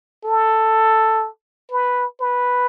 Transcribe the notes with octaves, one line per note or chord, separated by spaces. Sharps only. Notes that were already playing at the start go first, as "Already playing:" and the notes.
A4
B4
B4